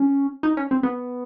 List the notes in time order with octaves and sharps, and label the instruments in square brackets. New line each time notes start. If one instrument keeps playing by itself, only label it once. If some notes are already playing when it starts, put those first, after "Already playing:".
Already playing: [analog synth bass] C#4
D#4
C#4
C4
B3